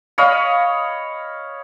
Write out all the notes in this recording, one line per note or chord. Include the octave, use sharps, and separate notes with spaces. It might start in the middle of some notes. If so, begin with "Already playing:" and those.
C#5 D#5 F5 B5